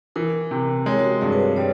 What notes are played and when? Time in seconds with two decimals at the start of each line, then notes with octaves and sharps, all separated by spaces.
0.16 E3 A#4
0.51 C3
0.86 G#3 C#5
0.99 F#4
1.04 G4
1.21 G2 G#4
1.32 B4
1.40 C5
1.56 G3 C#5